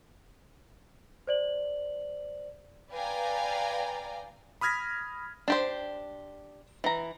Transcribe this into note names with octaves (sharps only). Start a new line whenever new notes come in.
C5 D5 F#7
B4 D5 F5 G5 G#5 A#5
B5 D#6 F6 G#6 A#6 B6
D4 G4 C5
E3 A#5